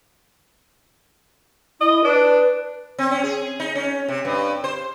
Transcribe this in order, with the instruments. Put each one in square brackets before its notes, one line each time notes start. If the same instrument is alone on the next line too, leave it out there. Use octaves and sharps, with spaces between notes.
[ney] E4 [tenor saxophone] D#5
[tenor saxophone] D4 [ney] B4
[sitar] C4
C#4
G#4
D#4
C#4
C3
G2
C5